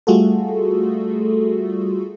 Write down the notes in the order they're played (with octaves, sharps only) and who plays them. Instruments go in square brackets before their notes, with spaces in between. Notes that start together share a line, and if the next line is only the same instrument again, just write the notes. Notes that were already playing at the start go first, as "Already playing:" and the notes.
[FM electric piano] G3 A3 F4 F#4 G#4 A4